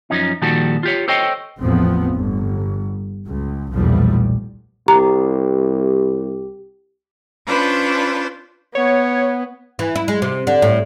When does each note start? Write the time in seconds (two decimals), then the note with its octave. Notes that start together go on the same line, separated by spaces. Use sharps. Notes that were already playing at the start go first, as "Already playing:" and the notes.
0.10 F#2 F3 C#4 D#4
0.42 A#2 D#3 F3 G3 F#4 A4
0.83 F4 G4 C#5
1.08 A4 C5 C#5 D#5 G5
1.60 A1 E2 A2 F3 B3 C4
2.14 G1
3.26 C#2
3.74 B1 E2 A#2 F3 G3 A3
4.88 C2 G4 A#5
7.46 C#4 D4 F4 B4 C5
8.75 B3 C#5
9.79 E3
9.96 E4
10.08 G#3
10.22 C3
10.47 D3
10.62 A2